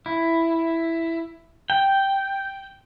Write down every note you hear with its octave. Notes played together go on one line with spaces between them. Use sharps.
E4
G5